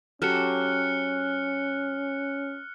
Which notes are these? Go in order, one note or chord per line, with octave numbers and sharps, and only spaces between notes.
F#3 C#4 G4 A4 F6 F#6 C#7